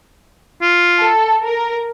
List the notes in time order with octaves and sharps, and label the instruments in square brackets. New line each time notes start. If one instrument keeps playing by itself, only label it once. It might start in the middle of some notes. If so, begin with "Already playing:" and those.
[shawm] F4
[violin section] A4
A#4